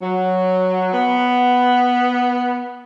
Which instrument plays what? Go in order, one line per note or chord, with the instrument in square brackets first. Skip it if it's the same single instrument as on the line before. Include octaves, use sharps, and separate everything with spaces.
[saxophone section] F#3
B3